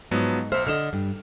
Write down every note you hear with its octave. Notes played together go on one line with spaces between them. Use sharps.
G#2 F3 F#3 B3
B1 C5 E5 F6
D3 D#5 F6 E7
G2